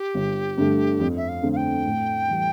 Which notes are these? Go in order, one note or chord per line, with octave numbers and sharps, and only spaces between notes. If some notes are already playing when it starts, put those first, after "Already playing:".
Already playing: G4
G1
G2 D3 A3
F2
E5
F5
D3 A3 C4
F5
G5
A2
E3 G3